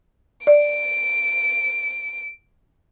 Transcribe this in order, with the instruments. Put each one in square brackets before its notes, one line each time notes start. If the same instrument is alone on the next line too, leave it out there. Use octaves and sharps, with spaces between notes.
[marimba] D5 [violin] D7